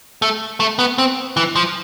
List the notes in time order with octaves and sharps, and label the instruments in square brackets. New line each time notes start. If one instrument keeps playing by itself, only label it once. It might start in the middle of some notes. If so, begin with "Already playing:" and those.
[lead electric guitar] A3
A3
B3
C4
E3
F3